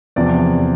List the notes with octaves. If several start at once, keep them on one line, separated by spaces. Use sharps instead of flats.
E2 C3 F3 D5